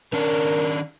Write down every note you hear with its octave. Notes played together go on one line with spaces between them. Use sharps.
D#3 C#4 D4 A#4